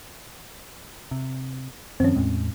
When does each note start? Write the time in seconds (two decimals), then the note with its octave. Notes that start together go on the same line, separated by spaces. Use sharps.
1.11 C3
2.00 F#2 D#3 F3 C4 C#4
2.15 E2 A2 G#3